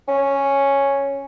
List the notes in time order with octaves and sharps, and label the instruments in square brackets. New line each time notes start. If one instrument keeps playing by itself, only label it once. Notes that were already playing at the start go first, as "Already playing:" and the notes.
[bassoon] C#4